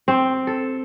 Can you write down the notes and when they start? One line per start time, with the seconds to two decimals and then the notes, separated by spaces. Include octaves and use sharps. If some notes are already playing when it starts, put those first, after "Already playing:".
0.08 C4
0.47 A4